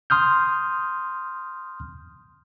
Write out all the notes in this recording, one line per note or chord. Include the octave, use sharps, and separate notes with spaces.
C6 D#6 F6 G6